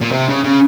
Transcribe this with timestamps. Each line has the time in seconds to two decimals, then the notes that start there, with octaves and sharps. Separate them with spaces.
0.01 A#2
0.12 C3
0.29 C#3
0.44 C#3